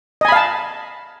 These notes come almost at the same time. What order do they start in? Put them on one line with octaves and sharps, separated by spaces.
D#5 G#5 B5 F5 A5